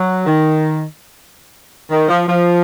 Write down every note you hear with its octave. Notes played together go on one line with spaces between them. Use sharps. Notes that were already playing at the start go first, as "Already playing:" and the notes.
Already playing: F#3
D#3
D#3
F3
F3